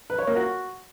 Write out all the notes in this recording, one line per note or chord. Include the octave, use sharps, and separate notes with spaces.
B4
C#5
A#3
F#4